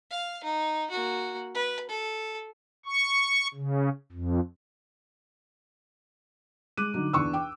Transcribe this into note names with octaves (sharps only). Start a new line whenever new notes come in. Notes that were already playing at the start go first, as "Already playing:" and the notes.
F5
D#4
A#3 F#4
B4
A4
C#6
C#3
F2
G#3 D6 F#6 D#7
D3 F#3 D#4
E2 D4 C#6 E6
G5 D6